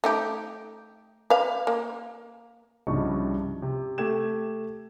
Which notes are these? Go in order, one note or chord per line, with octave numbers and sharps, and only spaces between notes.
A3 D#4 G4
B4 F5
A#3
C2 G2 C#3 F3 D#4 C#6
C3
A3 G4 G#6 E7